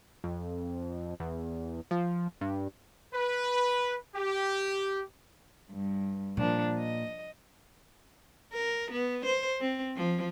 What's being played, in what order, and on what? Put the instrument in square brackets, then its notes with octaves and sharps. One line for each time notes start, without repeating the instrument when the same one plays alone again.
[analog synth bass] F2
E2
F3
G2
[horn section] B4
G4
[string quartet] G2
[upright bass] A#2 [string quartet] F3 D4
[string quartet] D#5
[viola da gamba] A#4
B3
C5
C4
F3